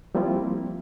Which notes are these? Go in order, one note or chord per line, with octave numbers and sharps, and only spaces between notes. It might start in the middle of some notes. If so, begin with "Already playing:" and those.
F3 G3 A#3 C4 E4 F4